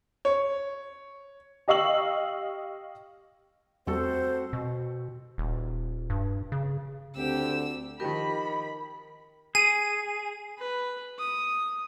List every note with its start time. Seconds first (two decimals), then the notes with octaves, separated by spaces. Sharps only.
0.25 C#5
1.68 G4 D#5 F5 C#6 E6 F#7
3.87 E2 G3 A3 C4 F#4 A4 C5
4.53 B2
5.38 D#1
6.10 G2
6.52 C#3
7.17 D2 D3 C4 G4 E6
8.00 D#3 F3 G4 A#4 D#5 B5
9.55 G#4 D#7
10.59 B4
11.19 D#6